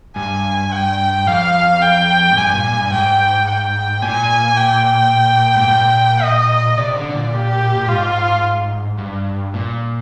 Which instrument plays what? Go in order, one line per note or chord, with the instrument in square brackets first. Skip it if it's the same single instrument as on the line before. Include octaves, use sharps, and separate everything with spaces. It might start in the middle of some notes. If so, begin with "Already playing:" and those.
[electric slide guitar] G2 [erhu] G#5
[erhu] G5
[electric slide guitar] F2 [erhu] F5
[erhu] G5
[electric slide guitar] G#2
[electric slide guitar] G2 [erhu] G#5
[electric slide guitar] A#2
G2
[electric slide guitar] G#2 [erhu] G5
[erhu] G5
[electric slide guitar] A#2 [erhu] G#5
[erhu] G5
[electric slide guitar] G#2
A#2
[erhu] D#5
[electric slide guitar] C3 [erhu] D5
[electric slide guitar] D3
C3
A#2
[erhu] G4
[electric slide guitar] A#2
[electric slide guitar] G#2 [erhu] F4
[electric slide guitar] G2
A#2